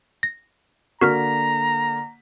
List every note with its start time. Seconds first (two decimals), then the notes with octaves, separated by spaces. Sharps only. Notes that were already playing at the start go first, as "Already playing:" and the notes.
0.23 A#6
1.01 D3 A#3 F#4 A#4 A#5 F6 B6